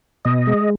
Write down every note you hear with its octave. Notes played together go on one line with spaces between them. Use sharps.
B2 D#5
G#3